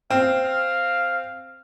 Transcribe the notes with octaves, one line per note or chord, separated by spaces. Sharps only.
C4 F5
F5